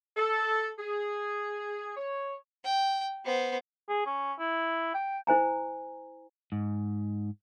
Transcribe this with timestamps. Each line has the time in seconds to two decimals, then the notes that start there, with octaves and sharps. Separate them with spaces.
0.17 A4
0.79 G#4
1.97 C#5
2.64 G5
3.25 B3 C5
3.89 G#4
4.06 C#4
4.39 E4
4.94 G5
5.27 E4 C5 G#5 A#5
6.52 G#2